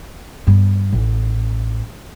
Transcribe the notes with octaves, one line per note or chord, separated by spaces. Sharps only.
G2 B3
A1